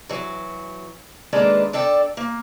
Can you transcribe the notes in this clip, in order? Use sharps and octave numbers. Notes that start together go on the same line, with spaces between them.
E3 F#3
D#3 G#3 A#3 D4 A4 B4
D4 A4 D5 G5
A#3